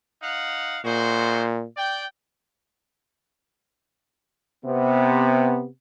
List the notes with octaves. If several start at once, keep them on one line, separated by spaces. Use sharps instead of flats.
D#4 F5 F#5
A#2 G#3 F#4 C5
D5 G5
C3 B3